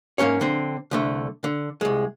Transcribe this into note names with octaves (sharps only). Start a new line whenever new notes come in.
G#2 A#3 C4 C#4 C#5
D3 C4
C2 D3 A3
D3
C2 G#3